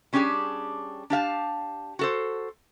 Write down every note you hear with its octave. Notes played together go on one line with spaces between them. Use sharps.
G3 C#4 D4 F4 G4 G#4
D4 G4 F5 A5
F#4 A4 C5